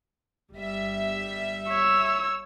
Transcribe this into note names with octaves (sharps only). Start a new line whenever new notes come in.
G1 G3 E5
C#5 E6